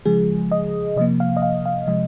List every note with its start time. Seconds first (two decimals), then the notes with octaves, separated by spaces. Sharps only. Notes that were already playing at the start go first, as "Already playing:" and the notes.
0.05 C#3 F3 G#3 G#4
0.52 D#5
0.96 C3 F3 A#3 D#5
1.20 F5
1.37 D#5
1.42 F5
1.66 F5
1.87 C3 F3 G#3 D#5